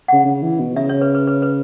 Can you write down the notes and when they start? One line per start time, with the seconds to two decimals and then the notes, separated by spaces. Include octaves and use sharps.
0.08 C#3 F#5
0.25 C#3
0.43 E3
0.60 B2
0.76 C#3 E5
0.89 C#5
1.02 B4
1.15 B4
1.27 B4
1.42 B4